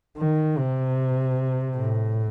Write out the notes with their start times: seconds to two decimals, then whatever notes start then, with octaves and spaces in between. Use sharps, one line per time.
0.18 D#3
0.58 C3
1.77 A2